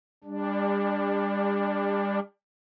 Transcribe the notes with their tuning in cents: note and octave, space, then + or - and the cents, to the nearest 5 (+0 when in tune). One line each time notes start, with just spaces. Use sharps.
G3 +35 D4 +0